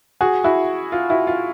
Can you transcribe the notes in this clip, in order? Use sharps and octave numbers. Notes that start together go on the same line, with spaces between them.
F#4 G#4
E4 F#4
F4
E4 F#4
F4